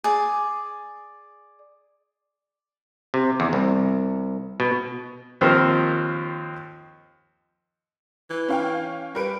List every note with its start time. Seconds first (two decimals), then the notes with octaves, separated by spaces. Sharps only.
0.04 G#4 D5
3.14 C3
3.40 E2
3.53 C2
4.60 B2
5.41 D#2 F3 C4 A#4
8.30 E3
8.48 C#4 F5 G5
9.15 G3 A#4 B4 D7